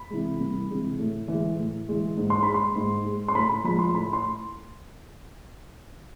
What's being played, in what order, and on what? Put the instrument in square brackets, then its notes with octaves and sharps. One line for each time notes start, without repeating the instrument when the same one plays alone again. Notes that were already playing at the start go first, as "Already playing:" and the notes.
Already playing: [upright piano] B5
C3 E3 G#3
C2
C3 E3 G#3
A2
E3
G#3
A2
E3 G#3
G#2
C6
G#3 B5
C6
G#2
G#3
C6
A2 B5
B5
F3 G#3 B5
C6
A2 B5
C6